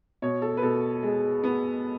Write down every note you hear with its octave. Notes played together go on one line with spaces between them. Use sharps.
B2 C#5
A4
B4
B2 A4
G#3
B3